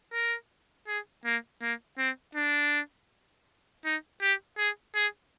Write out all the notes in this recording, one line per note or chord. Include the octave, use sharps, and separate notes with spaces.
A#4
G#4
A#3
A#3
C4
D4
D#4
G4
G#4
G#4